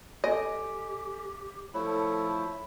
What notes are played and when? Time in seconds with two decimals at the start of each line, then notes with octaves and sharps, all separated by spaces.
0.24 G4 A4 D#5 G#5 D7
1.74 F3 A3 E4 A4 C#5